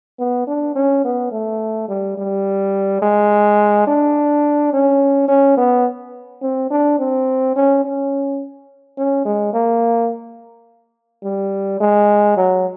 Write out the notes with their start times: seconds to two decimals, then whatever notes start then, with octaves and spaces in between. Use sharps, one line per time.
0.19 B3
0.47 D4
0.75 C#4
1.04 B3
1.32 A3
1.89 G3
2.18 G3
3.02 G#3
3.87 D4
4.73 C#4
5.28 C#4
5.57 B3
6.42 C4
6.71 D4
6.99 C4
7.56 C#4
7.84 C#4
8.97 C#4
9.25 G#3
9.53 A#3
11.24 G3
11.80 G#3
12.36 F#3